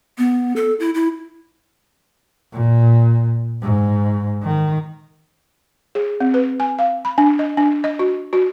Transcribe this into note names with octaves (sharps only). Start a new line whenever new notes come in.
B3
A4
E4
E4
A#2
G#2
D#3
G#4
C4
B4
G#5
F5
B5
D4
D#5
D4
D#5
F#4
F#4